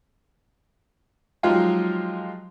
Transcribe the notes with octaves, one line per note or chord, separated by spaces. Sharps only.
F3 F#3 G#3 D#4 F4 G4